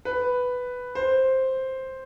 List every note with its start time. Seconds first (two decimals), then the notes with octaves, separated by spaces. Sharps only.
0.05 B4
0.95 C5